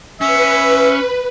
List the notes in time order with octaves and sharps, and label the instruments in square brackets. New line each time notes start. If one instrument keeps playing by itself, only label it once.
[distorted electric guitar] C#4 [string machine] B4 [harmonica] E5